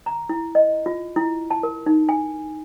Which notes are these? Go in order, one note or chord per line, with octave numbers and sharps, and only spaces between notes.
A#5
E4
D#5
F4
E4
A5
A#4
D#4
G#5